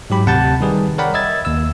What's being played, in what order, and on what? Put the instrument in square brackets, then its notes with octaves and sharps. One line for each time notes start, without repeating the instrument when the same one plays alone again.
[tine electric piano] G#2 F#3 G4 B5
D2 C3 F#5 A5 G6 A6
D#3 G3 D#4 G4 G#4 B4
A#4 C#5 D5 F#5 G5 B5
D#5 E5 E6 G#6 A6
D#2 E6